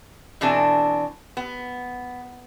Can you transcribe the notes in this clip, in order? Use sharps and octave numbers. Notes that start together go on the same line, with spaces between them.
B2 E3 C4 D4 A4 G#5
B3